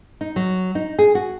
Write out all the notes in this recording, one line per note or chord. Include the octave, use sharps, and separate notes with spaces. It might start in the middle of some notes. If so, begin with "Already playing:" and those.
D#4
F#3
D#4
G#4
F#4